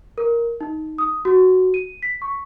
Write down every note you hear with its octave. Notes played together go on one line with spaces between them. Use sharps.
A#4
D#4
D#6
F#4
D#7
B6
C#6